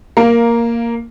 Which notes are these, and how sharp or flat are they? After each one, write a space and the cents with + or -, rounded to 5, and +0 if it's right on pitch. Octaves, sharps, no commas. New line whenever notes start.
A#3 +0 A#4 +5 F5 -10